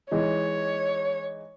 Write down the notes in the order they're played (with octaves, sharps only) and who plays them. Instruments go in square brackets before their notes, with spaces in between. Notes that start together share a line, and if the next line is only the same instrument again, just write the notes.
[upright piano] E3 G#3 D#4 [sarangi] C#5